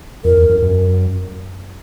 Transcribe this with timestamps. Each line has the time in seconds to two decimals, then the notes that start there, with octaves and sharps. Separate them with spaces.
0.24 F2 A#4
0.37 E2
0.50 F#2
0.62 F#2